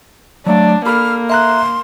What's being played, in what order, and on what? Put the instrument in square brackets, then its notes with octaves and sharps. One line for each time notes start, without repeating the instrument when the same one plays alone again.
[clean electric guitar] F#3 A3 F5 [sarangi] D4 [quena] D5
[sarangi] A#3 [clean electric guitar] G4 A4 B5 [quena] F6
[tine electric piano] E5 A#5 F#6 [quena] C6